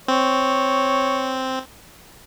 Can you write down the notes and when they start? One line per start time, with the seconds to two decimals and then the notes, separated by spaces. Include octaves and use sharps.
0.08 C4 C#5